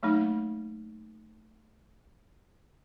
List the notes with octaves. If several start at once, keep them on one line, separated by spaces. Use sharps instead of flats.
F#3 A3 A#3 D#4